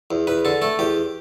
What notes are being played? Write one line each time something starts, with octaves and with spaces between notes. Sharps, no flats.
E2
E2 B4
D3 A4
A3 A4
E2 G4